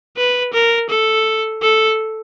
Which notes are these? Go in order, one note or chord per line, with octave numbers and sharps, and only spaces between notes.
B4
A#4
A4
A4